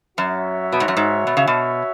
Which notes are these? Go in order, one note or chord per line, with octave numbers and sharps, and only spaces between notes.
F#2 F#4 C#5 E5
B2
G#2
F#2
G#2
B2
C#3
B2